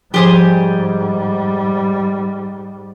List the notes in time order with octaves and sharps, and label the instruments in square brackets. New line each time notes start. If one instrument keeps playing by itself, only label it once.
[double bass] G#2 G3 [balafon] F3 [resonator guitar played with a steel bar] G4 G#4 C5